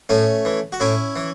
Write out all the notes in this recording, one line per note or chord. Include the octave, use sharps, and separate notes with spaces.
A2 A3 C#4
E3
F#4
A2 C#4 E4
E3